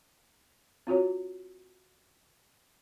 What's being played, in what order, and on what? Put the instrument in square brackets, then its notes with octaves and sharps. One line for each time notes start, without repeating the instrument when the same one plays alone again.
[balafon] C4 F4 F#4 C#5